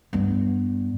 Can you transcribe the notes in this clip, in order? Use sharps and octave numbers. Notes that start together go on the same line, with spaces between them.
G2 B3